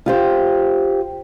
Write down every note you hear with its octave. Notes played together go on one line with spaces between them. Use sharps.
F4 G4 C5